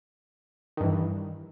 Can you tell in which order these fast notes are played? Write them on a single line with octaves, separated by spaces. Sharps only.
D#3 G2 E3